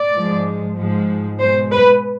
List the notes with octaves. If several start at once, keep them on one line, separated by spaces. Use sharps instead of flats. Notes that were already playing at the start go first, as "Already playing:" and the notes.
Already playing: D5
G#2 F3 G#3
G#2 F3 G#3
B2 G#3 C5
B4